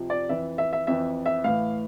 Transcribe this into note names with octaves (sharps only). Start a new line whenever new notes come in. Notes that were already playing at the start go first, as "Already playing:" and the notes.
Already playing: F2 C3 F3
D5
F2 E3 E5
E5
E5
F2 E3 E5
E5
A2 E3 F5